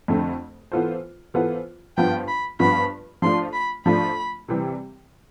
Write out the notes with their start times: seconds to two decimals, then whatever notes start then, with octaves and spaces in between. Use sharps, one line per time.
0.08 F2 D3 A3 C4
0.72 E3 B3 F4 A4 C5
1.34 E3 B3 F4 A4 C5
1.97 G2 F3 B3 F4 G5
2.28 B5
2.59 G2 F3 B3 F4 B5
3.22 F3 A3 D4 F4 C6
3.54 B5
3.86 F3 A3 D4 F4 B5
4.48 C3 E3 G3 C4